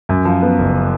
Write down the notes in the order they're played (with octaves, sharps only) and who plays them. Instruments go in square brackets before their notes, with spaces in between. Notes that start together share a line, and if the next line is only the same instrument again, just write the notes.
[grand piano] F#2
F3
B3
F#1